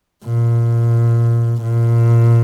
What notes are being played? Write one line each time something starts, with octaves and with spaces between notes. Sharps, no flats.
A#2
A#2